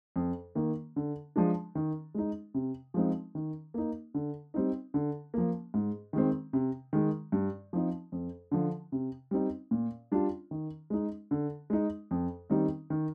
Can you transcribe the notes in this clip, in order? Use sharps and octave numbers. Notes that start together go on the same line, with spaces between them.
F2
D#3 A#3
D3
F3 G#3 D4
D#3
G#3 D#4
C3
F3 G#3 C4 D#4
D#3
A#3 D#4
D3
G3 C4 D#4
D3
F3 A#3
G#2
D#3 G#3 C4
C3
D#3 G#3
G2
F3 C4 D#4
F2
D3 F3
C3
G3 C4 D#4
A#2
G3 D4 F4
D#3
G#3 D#4
D3
G#3 D#4
F2
D#3 G3 C4 D#4
D#3